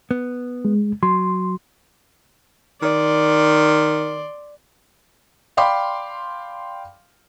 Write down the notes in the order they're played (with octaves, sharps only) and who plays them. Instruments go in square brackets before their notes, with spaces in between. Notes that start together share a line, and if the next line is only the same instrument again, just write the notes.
[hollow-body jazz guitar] B3
[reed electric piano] G#3
[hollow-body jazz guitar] F#3 [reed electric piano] C6
[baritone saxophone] D#3 [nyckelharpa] D5 C6
[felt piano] D5 F5 G5 B5 C6 D6